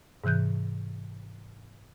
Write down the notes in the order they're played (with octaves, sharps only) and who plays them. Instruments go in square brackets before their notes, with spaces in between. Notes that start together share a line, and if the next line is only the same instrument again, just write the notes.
[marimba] G#2 C3 E3 F#6 G6